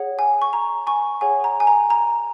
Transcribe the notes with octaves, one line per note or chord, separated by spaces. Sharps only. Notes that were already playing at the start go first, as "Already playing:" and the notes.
Already playing: G#4 C#5 F#5
G#5
C#6
A#5
G#5 C#6
G#4 C#5 F#5 G#5
A#5
G#5
A#5
A#5